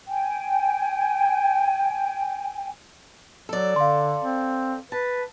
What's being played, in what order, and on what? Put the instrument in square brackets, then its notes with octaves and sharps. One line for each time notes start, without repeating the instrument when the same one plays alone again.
[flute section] G5 G#5
[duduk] F#3 [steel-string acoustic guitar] A4 D5
[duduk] D3 [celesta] F5 C6
[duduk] C4
[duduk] B4 [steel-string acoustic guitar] A5